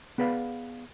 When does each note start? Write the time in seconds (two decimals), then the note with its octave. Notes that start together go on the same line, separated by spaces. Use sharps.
0.18 B3 G#4 B4 D5 F5